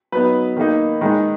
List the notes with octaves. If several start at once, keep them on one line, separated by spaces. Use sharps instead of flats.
F#3 B3 D#4 B4
D#3 A#3 D#4
D#3 G#3 D#4